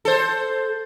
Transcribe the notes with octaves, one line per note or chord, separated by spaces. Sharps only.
A4 C5